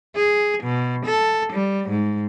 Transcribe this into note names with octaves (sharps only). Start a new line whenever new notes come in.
G#4
B2
A4
G3
G#2